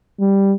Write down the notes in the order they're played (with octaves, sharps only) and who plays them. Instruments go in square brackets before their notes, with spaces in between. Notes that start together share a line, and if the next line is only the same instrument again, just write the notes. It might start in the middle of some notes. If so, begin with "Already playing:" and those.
[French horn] G3